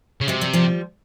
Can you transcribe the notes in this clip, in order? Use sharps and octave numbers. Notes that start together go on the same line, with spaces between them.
C#3
C3 F#3 G#3
F3 G3
F3 G3